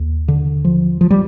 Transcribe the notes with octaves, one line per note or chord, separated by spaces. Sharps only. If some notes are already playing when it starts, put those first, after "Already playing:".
Already playing: D#2
D3
F3
F3
G3